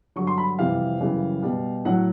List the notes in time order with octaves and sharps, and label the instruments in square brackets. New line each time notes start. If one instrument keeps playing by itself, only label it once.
[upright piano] G2 D3 F#3 C#6
C6
B5
F2 C3 E3 G3 F5
F#2 C#3 E3 G3
B2 G3
A2 F#3 F#5